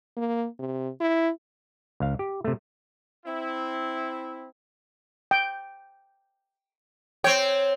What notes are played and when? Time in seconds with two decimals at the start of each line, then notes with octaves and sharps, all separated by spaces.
0.17 A#3
0.59 C3
1.00 E4
2.00 C#2 F5
2.19 G4
2.44 C3 A3
3.25 C4 E4
5.31 G5
7.24 C4 C#5 G5